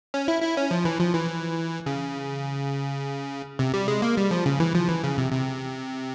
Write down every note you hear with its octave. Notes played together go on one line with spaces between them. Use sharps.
C#4
E4
E4
C#4
F3
E3
F3
E3
C#3
C3
G3
G#3
A#3
G3
F3
C#3
E3
F3
E3
C#3
C3
C3